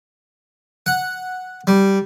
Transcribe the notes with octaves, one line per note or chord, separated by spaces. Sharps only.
F#5
G3